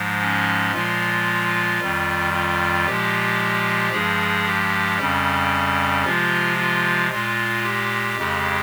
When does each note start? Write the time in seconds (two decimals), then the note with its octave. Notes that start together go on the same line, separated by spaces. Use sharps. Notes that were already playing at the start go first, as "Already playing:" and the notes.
Already playing: G#2 F3 G#3
0.21 C#4
0.74 A#2 F3 G#3 F4
1.80 F2 D#3 G3
2.33 F4
2.86 A#2 F3 G#3 G4
3.92 G2 F3 G#3 G#4
4.46 G4
4.98 F2 C#3 G3 C#4
6.05 C3 F3 G#3 F4
6.58 F4
7.11 A#2 G#3 F4
7.64 G4
8.17 F2 C#3 G#3